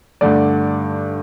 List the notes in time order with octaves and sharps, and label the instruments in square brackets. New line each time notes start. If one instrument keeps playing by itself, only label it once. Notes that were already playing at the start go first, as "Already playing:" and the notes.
[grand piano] G2 D3 A3 D5